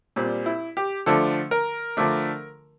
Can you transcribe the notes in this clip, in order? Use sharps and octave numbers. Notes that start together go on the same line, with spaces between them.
A#2 G3 C4
E4
G4
D3 F3 A3 D4 A4
A#4
D3 F3 A3 D4